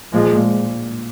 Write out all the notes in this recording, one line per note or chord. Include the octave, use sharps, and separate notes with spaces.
A#2 F3 G#3
A#2